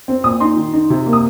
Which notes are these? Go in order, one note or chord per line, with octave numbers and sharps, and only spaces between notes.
C4
A#2 D#6
D#4 C6
D#3
D#4
C3
A#3
D#6